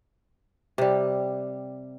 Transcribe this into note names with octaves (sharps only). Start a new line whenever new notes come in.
C3 G3